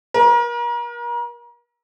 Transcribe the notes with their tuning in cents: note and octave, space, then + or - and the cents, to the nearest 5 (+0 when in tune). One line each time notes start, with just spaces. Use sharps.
A#4 +35